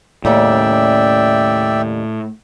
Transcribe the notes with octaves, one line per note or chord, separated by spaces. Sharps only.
D#2 A2 C#3 G3 D5 E5 G5